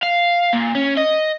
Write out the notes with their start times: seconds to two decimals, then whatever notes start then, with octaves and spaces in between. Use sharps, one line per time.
0.03 F5
0.53 A#2
0.75 C#4
0.97 D#5